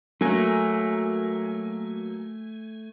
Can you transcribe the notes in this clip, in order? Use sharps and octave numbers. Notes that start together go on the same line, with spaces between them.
F#3 A3 A#3 G#5